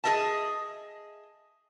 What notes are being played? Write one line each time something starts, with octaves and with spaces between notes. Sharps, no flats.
G#4 A#4 D#5 E5 A5